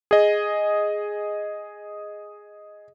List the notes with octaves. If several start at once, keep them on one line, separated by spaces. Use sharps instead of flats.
G#4 D#5